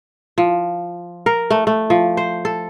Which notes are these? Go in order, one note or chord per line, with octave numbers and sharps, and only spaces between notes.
F3
A#4
A3
A3
F3
C5
A4